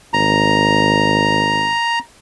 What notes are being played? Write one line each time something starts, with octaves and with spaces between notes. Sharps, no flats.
G#1 A#5